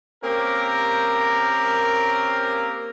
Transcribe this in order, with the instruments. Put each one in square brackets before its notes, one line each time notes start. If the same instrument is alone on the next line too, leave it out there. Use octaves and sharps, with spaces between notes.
[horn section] A#3 C4 C#4 G4 A#4